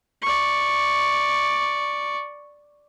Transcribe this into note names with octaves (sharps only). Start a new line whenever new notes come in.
D5 C#6